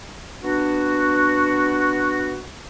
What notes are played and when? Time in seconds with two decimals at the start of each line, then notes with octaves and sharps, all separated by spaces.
0.43 B3 D4 F#4